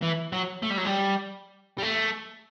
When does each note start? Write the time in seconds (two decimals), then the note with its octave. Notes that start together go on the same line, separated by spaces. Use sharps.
0.02 E3
0.32 F#3
0.62 A3
0.70 G3
0.77 F#3
0.85 G3
1.78 G3
1.83 A3